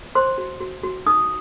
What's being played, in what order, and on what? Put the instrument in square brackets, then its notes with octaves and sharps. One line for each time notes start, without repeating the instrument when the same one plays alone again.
[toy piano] C5 C6
F#4
F#4
F#4
D#4 D#6